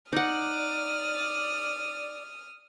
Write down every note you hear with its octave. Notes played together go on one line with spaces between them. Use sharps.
D#4 D5 F#5 D#6 F6